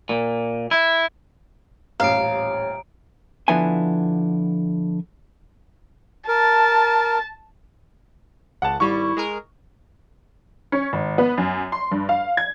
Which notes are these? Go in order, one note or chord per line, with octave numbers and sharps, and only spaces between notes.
A#2
E4
D#1 A1 C#5 F5 A#5 D7
D3 F3 B3 E4 F4 G#5
A#4 A5
C#2 F#5 A5
G#1 G3 E4 C#6
G#3 G#4 A#4
C#4
G#1
B3
F#2
C6
G2
F5
G#6